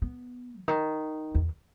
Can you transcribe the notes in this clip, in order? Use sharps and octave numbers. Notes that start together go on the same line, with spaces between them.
B3
C#3
D#3
E2